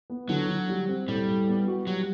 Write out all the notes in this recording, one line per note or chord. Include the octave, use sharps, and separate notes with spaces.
B3
D3 F#3
D3
G3
C4
A2 G3
A2
B3
F#4
F#3 G3